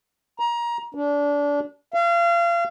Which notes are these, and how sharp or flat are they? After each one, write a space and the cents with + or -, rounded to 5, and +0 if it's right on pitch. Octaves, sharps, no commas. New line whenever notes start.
A#5 +25
D4 -25
F5 -35